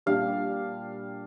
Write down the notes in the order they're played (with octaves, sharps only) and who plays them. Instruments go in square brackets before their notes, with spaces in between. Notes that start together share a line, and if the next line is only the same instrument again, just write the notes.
[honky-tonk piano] A#2 G3 D4 G4 [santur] F5